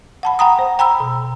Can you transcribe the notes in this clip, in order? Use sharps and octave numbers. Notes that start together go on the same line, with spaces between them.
F#5 A5 B5
F#5 G5 A#5 D#6
C5
G5 A#5 B5 E6
B2